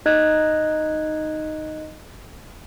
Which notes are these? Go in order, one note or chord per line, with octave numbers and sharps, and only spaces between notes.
D#4 D#5 F#6 G#6